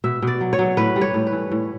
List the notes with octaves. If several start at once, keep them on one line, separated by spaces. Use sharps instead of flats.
B2 E5
B2 D5
F#3
C#5
F#3
A2 B4
G3
C#5
A2
B4
E3
A2